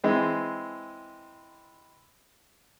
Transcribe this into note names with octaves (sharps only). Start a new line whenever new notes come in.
E3 G#3 C4